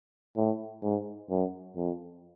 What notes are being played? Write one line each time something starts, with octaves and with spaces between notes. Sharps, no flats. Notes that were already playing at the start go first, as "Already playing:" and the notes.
A2
G#2
F#2
F2